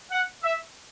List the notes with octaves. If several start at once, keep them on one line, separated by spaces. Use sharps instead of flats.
F#5
E5